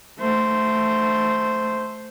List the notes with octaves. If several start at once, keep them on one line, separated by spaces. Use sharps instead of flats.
A3 C5